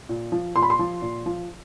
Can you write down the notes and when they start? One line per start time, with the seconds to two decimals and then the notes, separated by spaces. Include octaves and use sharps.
0.09 A#2
0.32 F3
0.56 A#2 C6
0.62 B5
0.70 C6
0.79 F3
1.02 A#2
1.26 F3